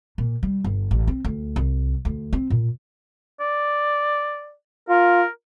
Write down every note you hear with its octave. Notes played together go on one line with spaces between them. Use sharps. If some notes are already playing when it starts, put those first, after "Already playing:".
A#2
G3
G1
A1
C4
D2
C2
D2
C4
A#2
D5
F4 A#4